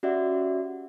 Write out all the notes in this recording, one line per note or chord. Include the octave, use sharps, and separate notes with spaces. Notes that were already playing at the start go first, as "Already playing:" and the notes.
C#4 F#4 G4 D5 E5 F#5